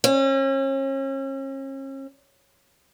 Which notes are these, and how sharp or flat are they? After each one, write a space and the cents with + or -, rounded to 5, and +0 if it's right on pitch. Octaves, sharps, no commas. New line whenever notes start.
C#4 -40